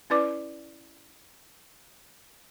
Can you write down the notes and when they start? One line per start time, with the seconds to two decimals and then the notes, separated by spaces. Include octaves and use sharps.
0.10 C#4 E4 B4 D5 D6